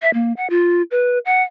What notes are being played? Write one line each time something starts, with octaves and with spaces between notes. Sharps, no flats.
E5
A#3
F#5
F4
B4
F#5